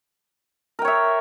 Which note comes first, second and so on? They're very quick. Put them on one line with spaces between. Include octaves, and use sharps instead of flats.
A#4 G5 C#5 E5